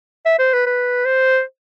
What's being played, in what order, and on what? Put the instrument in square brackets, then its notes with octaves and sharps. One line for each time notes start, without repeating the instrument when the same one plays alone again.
[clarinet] E5
C5
B4
B4
C5